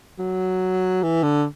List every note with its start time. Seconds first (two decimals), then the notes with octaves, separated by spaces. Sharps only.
0.19 F#3
1.03 E3
1.23 D3